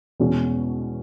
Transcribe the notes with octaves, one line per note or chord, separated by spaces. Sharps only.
E2 B2 G#3 C#4